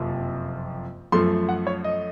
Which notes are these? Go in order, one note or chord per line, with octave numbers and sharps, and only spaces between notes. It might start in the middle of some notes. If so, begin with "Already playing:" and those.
Already playing: F#1 F2 C3 F3 A#3
F#2 F3 A3 C6
F#5
C#5
D#5